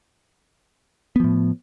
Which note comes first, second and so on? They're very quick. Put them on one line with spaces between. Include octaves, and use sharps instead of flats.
B3 F3 A2